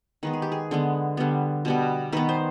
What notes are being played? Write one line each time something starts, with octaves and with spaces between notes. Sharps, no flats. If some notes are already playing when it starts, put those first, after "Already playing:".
D#3 G#3 B3 B4
G#4
G4
G#4
D3 G#3 B3
D3 G3 B3
B2 G3 B3
D#3 B3 B4
C5